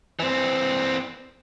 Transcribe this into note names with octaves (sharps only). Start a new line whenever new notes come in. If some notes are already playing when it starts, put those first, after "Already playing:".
E3 C4